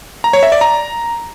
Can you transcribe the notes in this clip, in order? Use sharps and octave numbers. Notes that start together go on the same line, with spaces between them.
A#5
C#5
E5
D5
A#5